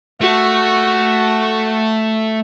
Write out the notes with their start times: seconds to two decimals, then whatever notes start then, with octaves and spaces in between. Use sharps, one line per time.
0.21 A3 F#4